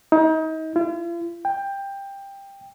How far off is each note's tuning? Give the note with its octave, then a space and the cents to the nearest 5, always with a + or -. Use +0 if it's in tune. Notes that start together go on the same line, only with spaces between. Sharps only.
D#4 +35
F4 -45
G5 +15